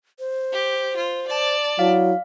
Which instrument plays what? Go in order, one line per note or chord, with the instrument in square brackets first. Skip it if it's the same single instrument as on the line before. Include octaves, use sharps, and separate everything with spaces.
[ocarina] C5
[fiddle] G4
F4
D5 A5
[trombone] F#3 [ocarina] E4 [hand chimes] F5